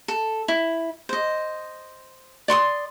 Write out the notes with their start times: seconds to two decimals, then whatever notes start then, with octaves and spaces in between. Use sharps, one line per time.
0.08 A4
0.48 E4
1.09 C5 D#5
2.48 D5 C6 C#6 D#6